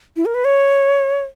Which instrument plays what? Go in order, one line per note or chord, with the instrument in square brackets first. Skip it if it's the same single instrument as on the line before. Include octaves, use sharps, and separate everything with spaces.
[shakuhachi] E4
A#4
B4
C#5